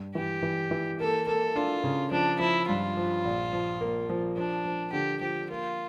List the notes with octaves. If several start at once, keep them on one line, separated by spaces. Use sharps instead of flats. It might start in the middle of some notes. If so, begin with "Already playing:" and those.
Already playing: G2 G3
E3 G4
E3
E3
A#3 A4
A#3 A4
D4 F4
C#3
F3 D4
F3 E4
G2 F4
F3
A#1
F3
A#3
F3
F3 D4
F3
D3 G4
F3 G4
A#3 F4